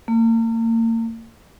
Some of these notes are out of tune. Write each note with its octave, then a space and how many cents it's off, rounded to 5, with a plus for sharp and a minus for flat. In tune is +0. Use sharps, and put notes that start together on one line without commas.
A#3 -40